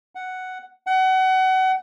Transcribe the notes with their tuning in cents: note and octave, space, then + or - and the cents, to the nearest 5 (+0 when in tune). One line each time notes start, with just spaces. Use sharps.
F#5 +5
F#5 +30